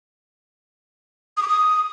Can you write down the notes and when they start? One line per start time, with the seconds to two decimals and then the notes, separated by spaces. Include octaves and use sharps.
1.37 D#6
1.42 D6
1.48 D#6